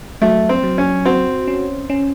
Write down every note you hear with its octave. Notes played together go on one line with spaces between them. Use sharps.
F#3 A3
C4
F#3
C#4
C4 F#4
C#4
C#4